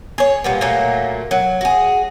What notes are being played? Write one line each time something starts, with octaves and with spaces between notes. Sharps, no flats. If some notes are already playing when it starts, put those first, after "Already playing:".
G#4 C#5
A#2 G3 B3
A#2 F#3 A3 A#3
F#3
F#4 G#4